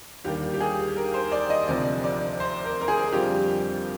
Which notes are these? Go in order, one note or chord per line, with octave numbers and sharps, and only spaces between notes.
D#2 D3 G3 A#3 G4
G4
G#4
A#4
C5
D5
D#5
D2 C3 F3 D5
D5
C5
A#4
A#4
G#4
F2 D3 G3 C4 F4 G4